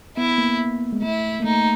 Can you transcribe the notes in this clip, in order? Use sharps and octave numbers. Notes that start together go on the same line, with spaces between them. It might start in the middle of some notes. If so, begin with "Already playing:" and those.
B3 E4
A#3
G#3
A3 E4
A#3
A3 D#4